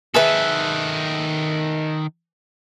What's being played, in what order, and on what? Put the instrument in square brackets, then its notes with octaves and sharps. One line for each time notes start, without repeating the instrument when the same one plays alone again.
[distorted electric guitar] D#3 A4 [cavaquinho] G#4 B4 E5